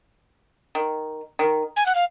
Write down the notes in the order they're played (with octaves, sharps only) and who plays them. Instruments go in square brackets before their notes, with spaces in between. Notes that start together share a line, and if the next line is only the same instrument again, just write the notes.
[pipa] D#3
D#3
[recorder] G#5
F#5
F5